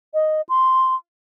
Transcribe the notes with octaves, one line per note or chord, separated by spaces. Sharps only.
D#5
C6